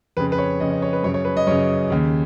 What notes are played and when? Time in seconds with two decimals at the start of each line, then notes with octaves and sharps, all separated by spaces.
0.17 F2 C#3 B4
0.32 B4
0.38 C#5
0.60 F2 C#3 D#5
0.71 D#5
0.82 C#5
0.93 B4
1.03 F#2 C#5
1.07 C#3
1.14 C#5
1.25 B4
1.37 D#5
1.47 F#2 C#3 C#5
1.90 D#2 C#3